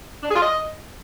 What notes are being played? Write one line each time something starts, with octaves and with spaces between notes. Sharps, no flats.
D4
G#4
F4
D#5